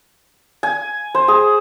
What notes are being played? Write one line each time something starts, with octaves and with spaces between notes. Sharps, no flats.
G#5
C5
G#4